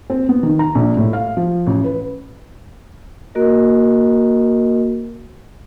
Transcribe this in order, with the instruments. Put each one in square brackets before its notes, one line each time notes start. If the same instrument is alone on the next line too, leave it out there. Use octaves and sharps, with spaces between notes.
[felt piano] C4
B3
D#3
A#5
A#1
A2
F5
F3
A1
B4
[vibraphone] A#3 F#4 A#4 D#5